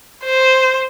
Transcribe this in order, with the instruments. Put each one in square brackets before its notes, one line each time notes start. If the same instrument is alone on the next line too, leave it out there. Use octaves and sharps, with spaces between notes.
[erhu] C5